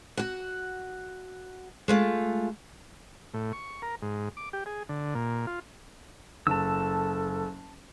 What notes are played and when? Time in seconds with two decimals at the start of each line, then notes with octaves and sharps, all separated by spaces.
0.17 F#4 F#5
1.88 G#3 A3 F4
3.34 A2
3.53 C#6
3.82 A#4
4.02 G#2
4.37 D6
4.53 G4
4.66 G#4
4.89 D3
5.15 A#2
5.47 F4
6.47 F#1 A4 A5 E6